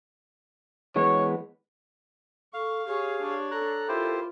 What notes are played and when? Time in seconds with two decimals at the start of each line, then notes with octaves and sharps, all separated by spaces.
0.96 E3 G#3 B3 C#5
2.54 A4 F5 C#6
2.87 G4 G#4 C#5
3.20 D4 C#5
3.51 A4 A#5 F#6
3.88 E4 F4 G4 A#4 C5